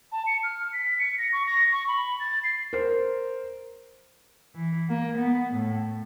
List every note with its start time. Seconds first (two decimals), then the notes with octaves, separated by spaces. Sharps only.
0.12 A5
0.27 C#7
0.43 F6
0.73 B6
0.99 C#7
1.18 A#6
1.33 C#6
1.46 A#6
1.72 C#6
1.88 B5
2.20 A6
2.44 C7
2.73 A#4 C5
4.55 E3
4.89 A#3
5.18 B3
5.54 A2